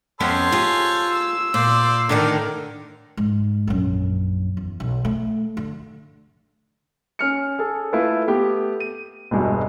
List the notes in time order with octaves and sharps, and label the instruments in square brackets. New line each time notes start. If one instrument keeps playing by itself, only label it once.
[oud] F2 B3 C#4 [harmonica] A4 C5 C#5
[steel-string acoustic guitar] F4 [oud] G4 G#4
[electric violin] E6
[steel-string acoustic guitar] A#2 [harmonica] C5 D5
[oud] A2 D3 D#3 [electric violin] D4 A#4 [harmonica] D#4 D5
[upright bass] G#2
A#1 F#2
E2
B1
A3
D3
[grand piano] C#4 F6 C#7
G#4 A4
A3 E4 F4 B4
A3 B3 G4
D#7
E1 G2 G#3 F#4